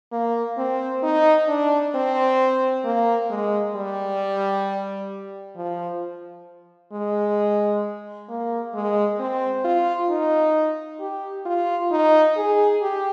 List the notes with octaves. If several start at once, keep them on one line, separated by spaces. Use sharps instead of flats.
A#3
C4
D#4
D4
C4
A#3
G#3
G3
F3
G#3
A#3
G#3
C4
F4
D#4
G4
F4
D#4
G#4
G4